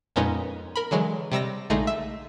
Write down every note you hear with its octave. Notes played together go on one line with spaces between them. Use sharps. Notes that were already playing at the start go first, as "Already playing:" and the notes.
F2 A#2 G#3 B3 C#4 D#4
A#4 B5
D3 E3 F#3 G#3
C3 G3 E6 A#6
A#1 D3 G#3 A3 D#4
E5